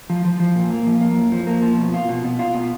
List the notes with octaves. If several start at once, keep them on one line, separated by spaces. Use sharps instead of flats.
F3
F3
F3
A#2
A#3
F3
A#3
F#2
F3
A#3
F3
B2
F4
B2
B2
F4
B2